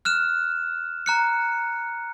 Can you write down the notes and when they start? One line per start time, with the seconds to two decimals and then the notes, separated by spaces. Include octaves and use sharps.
0.05 F6 F#6 E7
1.06 A#5 F#6 C#7